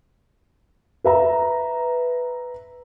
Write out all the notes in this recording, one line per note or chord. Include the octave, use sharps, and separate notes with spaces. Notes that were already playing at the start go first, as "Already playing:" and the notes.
B4 E5 A#5